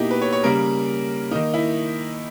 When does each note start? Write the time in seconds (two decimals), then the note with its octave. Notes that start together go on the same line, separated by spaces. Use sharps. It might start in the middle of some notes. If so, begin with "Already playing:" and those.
Already playing: B2 A#3 D#4 E4 G4
0.11 B4
0.22 C#5
0.33 C#5
0.44 C#3 G3 A#3 A#4
1.31 D#3 A#3 D#4
1.54 E4